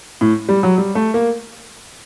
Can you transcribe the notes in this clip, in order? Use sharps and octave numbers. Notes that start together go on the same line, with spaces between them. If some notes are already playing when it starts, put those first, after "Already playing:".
A2
G3
F#3
G3
A3
A#3